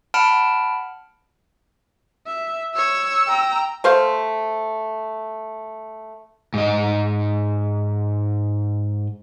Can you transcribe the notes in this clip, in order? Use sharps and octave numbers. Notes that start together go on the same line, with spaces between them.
F#5 A5 B5 F6 D7
E5
C#5 E6
G5 A#5
A3 C5 F5
G#2 D#5